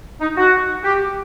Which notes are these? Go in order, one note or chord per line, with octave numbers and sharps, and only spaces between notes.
D#4
F#4
G4